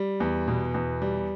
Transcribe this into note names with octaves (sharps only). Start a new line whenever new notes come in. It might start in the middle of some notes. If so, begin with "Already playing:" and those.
Already playing: G3
E2
B2
E2
G3